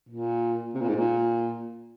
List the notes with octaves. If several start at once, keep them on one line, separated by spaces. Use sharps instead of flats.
A#2
C3
A#2
G#2
A#2